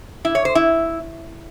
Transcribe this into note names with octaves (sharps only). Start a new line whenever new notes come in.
E4
C#5
C5
E4